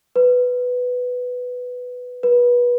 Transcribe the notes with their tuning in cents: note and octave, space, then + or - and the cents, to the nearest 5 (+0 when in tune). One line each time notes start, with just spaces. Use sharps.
B4 +5
B4 -25